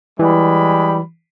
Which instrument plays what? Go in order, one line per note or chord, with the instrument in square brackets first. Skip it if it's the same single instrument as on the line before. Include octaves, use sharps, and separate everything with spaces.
[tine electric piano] E3 [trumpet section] G3 G#3 B5